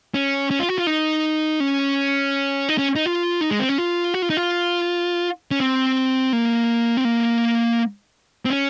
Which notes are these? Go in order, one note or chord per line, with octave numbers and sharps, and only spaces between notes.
C#4
C#4
F4
F#4
F4
D#4
C#4
D#4
C#4
D#4
F4
D#4
G#3
C4
C#4
F4
F#4
F4
D#4
F4
C#4
C4
A#3
C4
A#3
C4
C#4